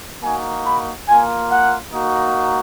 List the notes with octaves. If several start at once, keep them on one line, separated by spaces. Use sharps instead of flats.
A#3 D#4 F#4 G#5
B5
A#3 F4 G#5
F#5
A#3 D#4 F#4